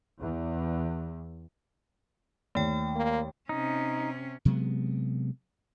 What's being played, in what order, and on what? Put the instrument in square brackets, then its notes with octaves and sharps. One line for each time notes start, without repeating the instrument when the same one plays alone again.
[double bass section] E2
[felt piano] D#2 [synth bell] A3 G5
[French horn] A#3
[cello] C3 C#4 [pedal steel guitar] D#4
[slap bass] C3 F#3 G#3 B3